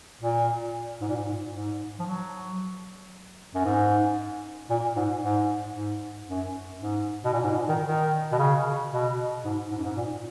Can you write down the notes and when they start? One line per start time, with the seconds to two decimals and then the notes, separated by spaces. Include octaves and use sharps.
0.21 A#2
1.01 G#2
1.08 A#2
1.16 G#2
1.54 G#2
1.99 F3
2.06 F#3
3.55 F#2
3.65 G#2
4.70 A#2
4.96 G#2
5.23 G#2
5.75 G#2
6.28 F#2
6.81 G#2
7.25 B2
7.33 A#2
7.44 G#2
7.51 A#2
7.69 D#3
7.86 D#3
8.32 B2
8.39 C#3
8.92 B2
9.44 G#2
9.71 G#2
9.77 F#2
9.85 G#2
9.96 A#2